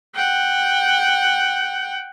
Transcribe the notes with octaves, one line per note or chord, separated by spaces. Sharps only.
F#5 G5